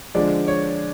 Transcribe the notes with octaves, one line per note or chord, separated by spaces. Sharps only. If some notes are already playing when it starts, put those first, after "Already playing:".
D3 F3 G#3 D5
C#5